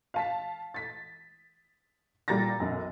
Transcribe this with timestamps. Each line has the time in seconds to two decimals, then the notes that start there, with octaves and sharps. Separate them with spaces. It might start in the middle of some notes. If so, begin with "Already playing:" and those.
0.14 F5 A5 B6
0.74 A6 B6
2.28 A#2 G3 A#5 A6 A#6
2.60 B1 F#2